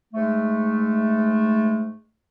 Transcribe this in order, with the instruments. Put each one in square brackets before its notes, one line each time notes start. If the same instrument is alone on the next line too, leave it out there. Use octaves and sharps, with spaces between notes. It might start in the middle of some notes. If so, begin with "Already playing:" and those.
[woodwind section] G#2 G#3 A3